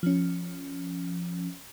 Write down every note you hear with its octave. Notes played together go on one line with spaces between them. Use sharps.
F3 C#4